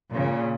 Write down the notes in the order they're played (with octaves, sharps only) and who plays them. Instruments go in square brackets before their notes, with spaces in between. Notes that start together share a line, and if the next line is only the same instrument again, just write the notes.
[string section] A#2 C#3